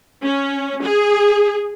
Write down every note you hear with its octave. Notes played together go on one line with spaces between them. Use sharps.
C#4
G#4